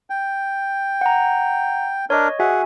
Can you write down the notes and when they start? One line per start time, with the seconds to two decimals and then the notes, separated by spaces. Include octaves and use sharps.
0.10 G5
1.01 F#5 A#5
2.10 D4 A#4 C#5 D#5
2.40 F#4 G#4 E5 F#5 G#5